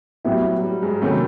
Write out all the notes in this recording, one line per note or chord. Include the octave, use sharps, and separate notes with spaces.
A2 F#3 G3 B3 E4 G4
F#3
G3
G#2 G#3
A2 C3 D#3 F#3 A3 A#3 C#4